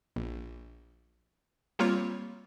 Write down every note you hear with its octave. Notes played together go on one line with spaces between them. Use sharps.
A#1
G3 A#3 C4 F4 A#4 C#5